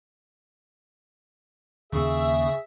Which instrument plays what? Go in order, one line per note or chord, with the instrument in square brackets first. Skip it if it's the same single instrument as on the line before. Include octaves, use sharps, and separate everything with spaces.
[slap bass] D#2 C#4 [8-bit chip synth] C#3 C#6 D#6 [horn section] G#4 E5